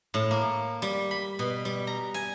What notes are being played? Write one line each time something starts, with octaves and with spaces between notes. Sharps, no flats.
A2
A#3
G3
B5
B2
G3
A#5
G#5